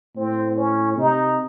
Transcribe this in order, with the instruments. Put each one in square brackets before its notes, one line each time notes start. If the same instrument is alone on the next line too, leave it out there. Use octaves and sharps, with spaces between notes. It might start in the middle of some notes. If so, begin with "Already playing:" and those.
[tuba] A2 [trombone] C4
[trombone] C#4
[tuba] C3 [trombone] D#4